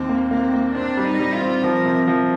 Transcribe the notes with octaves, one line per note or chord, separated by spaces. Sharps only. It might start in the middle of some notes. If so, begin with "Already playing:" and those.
Already playing: D#2 C4
A#3
A#3 C4
A#3
C4 D4
G3
D#4
G3
F4
C4
F3 A#4
C3
F3